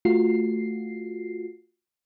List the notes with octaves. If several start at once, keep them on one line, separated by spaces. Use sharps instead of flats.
A3 F4 F#4 C7